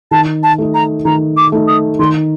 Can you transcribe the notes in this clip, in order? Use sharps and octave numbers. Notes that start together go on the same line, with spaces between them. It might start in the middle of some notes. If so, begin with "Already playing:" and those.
D#3 A5
A5
A3 D#4
A#5
D#3 A#5
D6
A3 D#4
D#6
D#3 C6